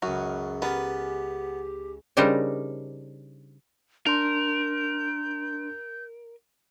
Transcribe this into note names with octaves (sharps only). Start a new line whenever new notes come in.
C#2 F#2 F#4 D#6 F6
B3 G4 A#4 B4 G#5 F6 A6
C#3 G3 D4 D#4 A#4 C5
D4 A#4 C6 G6